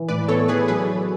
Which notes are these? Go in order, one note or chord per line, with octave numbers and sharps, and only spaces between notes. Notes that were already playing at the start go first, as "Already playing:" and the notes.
Already playing: E3
A2 B4 D5
B3 A4 C#5
E3 G#4 B4
F#3 G#4 B4
F#4